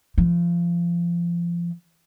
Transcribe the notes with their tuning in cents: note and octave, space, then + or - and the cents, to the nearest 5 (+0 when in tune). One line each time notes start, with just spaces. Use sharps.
F3 -25